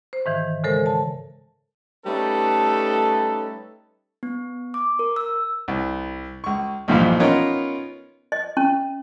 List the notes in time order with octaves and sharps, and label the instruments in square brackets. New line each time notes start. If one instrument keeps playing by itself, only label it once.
[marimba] C5
G#2 D#3 E3
C#3 G#3 A4 A#4 C5
A5
[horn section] G3 A3 C#4 D#4 A4 B4
[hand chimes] B3
D6
A#4
E6
[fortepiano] C2
C#2 C#6
B1 G2 A#2 E3 F3 F5
B3 C#4 D#4 F4 A#4 C#5
[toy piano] D#5
C#4